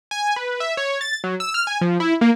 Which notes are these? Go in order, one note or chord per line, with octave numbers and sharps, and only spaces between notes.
G#5
B4
E5
C#5
A6
F#3
E6
F6
G#5
F3
E4
A#3